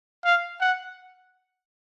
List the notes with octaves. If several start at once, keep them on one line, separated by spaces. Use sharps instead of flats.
F5
F#5